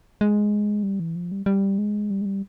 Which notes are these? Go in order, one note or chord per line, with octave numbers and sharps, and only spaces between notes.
G#3
G3
E3
F3
G3
G3
G#3
G3
G#3
G3